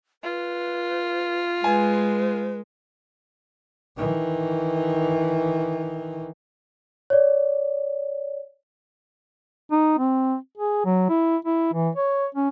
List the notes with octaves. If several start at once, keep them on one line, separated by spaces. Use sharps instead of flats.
F4 B4
G#3 B4 G#5
D#3 E3
C#5 D5
D#4
C4
G#4
F#3
E4
E4
E3
C#5
C#4